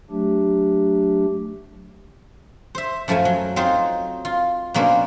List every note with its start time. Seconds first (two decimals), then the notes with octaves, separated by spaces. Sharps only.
0.11 F#3 A3 D4 G4
2.75 C5 E5
3.08 F#2 F3 A3 A#4 G#5
3.25 F#3
3.56 F#3 C4 D#4 F4 C5
4.25 F4
4.74 B2 F#3 A#3 C#4 D4 C5